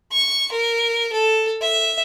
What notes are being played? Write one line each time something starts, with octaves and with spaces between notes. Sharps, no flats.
C#6
A#4
A4
E5